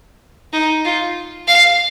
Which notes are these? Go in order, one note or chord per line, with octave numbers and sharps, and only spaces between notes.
D#4
F4
F5